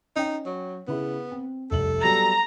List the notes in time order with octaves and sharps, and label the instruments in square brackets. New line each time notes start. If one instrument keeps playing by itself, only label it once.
[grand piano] C#4 G5 [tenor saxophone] D#4
[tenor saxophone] F#3
[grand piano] C#3 E4 G#4 [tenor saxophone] B3
[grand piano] C4
[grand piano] F1 C2 F#7 [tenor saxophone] A4
[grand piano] F#3 G3 B3 [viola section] A#5